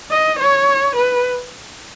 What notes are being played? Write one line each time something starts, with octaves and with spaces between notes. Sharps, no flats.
D#5
C#5
B4